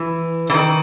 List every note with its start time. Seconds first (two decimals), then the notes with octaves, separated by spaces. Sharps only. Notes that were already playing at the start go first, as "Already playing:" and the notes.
Already playing: E3
0.50 E3
0.54 D#3